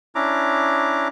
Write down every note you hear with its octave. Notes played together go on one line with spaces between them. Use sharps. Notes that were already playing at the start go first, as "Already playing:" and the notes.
C#4 D4 E4 A#5 D6